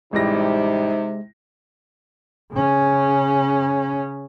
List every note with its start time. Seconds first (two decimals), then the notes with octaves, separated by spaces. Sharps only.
0.13 A1 C3 G3 G#3 D#4 A#6
2.52 C#3 C#4